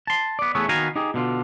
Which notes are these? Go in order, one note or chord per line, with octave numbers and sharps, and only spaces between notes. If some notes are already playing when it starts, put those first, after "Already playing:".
A5 C6
B3 D5
E2 A3 B3 G#4 C#5 E5
D#3 B3 F#4 F5 G#5 A#5
D#4 G4 G#4
B2 D3 F4